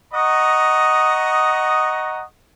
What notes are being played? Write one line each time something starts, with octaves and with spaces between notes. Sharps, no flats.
D#5 F#5 A#5 C#6 D#6